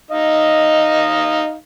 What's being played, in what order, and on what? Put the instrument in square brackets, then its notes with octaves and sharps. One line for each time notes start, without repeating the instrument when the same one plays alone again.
[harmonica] D#4 D#5 F5